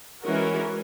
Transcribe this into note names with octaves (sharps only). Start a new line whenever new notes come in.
E3 G#3 C#4 F#4 A#4